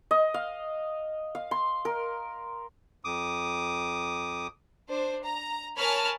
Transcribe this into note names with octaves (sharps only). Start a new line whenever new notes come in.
D#5
F5
F5
C6
A#4
F2 D6 D#6
D4 C5
A#5
A#4 C#5 G#5 A5 B5 F6